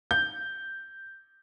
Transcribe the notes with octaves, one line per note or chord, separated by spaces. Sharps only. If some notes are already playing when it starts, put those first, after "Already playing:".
G6